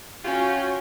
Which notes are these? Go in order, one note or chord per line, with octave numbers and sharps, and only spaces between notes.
C#4 F4 F#4 C#5 G5 G#5